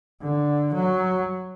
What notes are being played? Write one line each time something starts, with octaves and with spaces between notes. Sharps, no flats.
D3
F#3